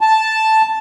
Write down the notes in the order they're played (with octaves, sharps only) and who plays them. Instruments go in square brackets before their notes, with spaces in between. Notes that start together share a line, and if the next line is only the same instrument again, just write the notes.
[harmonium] A5